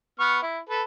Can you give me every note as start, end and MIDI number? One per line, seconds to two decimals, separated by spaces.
0.20 0.39 59
0.20 0.39 85
0.20 0.39 89
0.42 0.59 64
0.69 0.83 69
0.69 0.83 71